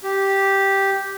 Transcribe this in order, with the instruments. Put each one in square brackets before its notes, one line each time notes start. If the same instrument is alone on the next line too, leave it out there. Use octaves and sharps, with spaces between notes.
[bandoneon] G4